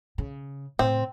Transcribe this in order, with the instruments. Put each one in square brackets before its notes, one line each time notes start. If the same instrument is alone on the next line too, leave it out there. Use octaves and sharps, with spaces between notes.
[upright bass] C#3
[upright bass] A2 C#3 [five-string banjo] C4